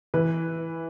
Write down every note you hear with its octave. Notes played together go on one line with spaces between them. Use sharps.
E3 B4